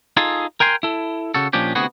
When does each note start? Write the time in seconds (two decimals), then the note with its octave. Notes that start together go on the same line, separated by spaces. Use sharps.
0.17 D#4 F4 G#4 A4
0.60 A#4 G5 G#5 C6
0.83 E4 A4
1.34 C#3 F#4 A4
1.53 A#2 F3 C#4 D4 G4
1.75 D2 C3 B3 F#4 G#4